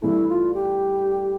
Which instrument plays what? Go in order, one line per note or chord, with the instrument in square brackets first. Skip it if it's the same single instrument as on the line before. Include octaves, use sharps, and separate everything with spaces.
[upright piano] G2 E3 A3 [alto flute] E4
[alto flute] F4
G4